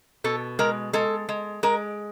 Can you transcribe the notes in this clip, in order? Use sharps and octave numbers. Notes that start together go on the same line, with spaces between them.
B2 A4
G#3 A#4
G#3 A4
G#3
G#3 A#4